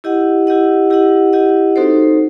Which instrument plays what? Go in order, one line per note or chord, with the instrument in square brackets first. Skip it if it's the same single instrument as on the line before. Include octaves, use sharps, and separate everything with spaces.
[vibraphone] E4 G4 D#5 F#5
E4 G4 D#5 F#5
E4 G4 D#5 F#5
E4 G4 D#5 F#5
C4 D#4 F#4 A4 C5